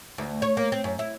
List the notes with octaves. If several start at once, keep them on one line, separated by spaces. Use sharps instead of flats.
D2
C#5
A#3
C4
F#2
E4